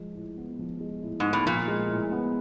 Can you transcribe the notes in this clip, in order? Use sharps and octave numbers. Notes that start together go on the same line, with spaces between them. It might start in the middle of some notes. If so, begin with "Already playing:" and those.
Already playing: F3 G#3
A2
B3
F3
G#3
A2
G#2 B3
A2
A#2 F3
G#3
A2
B3